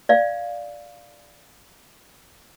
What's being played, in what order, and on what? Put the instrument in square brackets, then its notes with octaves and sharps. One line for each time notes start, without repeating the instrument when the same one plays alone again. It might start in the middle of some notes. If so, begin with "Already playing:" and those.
[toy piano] D5 F5